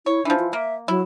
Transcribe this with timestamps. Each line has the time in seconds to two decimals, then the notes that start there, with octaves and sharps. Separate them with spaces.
0.06 E4 C#5
0.25 E3 F3 D4
0.39 F4
0.53 A#3 E5
0.88 F#3 E4